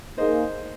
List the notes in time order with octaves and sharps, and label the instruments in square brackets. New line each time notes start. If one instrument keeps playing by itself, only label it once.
[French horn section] A#3 D#4 G#4 [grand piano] C5 D#5